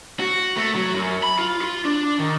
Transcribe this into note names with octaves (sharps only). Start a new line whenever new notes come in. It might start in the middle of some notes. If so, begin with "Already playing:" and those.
F#4
A3
F#3
F#2
B5
F4
F4
D4
D#3